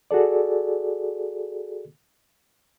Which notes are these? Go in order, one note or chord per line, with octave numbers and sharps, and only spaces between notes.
F#4 G#4 A4 D5